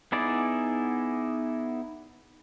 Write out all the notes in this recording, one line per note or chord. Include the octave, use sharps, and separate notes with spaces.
B3 D#4 E4 G#4 D5